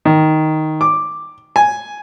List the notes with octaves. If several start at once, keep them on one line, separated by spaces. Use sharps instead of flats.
D#3
D6
G#5